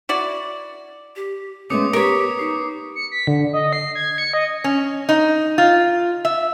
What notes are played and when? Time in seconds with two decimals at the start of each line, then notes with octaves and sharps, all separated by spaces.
0.09 E4 F#4 D5
1.16 G4
1.70 G#3 A3 B3 C#4 D6 D#6 C#7
1.93 B3 G4 A#4 C#5
2.39 D#4 C7
2.96 C#7
3.12 B6
3.27 D3
3.53 D#5
3.73 C7
3.95 G#6
4.18 C#7
4.34 D#5
4.64 C#4
5.09 D#4
5.58 F4
6.25 E5